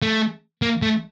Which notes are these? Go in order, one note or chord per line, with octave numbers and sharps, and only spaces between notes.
A3
A#3
A3